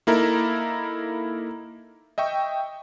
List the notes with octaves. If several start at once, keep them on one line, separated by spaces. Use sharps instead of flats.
A#3 D#4 E4 A4 A#4 A#5
D#5 E5 G5 C#6